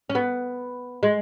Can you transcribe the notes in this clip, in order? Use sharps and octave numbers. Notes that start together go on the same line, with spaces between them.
C#4
B3
G#3